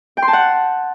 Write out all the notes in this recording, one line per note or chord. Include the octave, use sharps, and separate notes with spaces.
G5
C6
A5
F#5